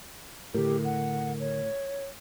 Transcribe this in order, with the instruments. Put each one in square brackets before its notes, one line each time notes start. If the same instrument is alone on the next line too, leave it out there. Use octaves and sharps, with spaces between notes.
[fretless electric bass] A2 [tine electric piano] D3 A#4 [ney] G4
[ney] F#5
C#5